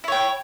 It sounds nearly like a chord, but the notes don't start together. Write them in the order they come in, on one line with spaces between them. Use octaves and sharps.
E4 C#5 G5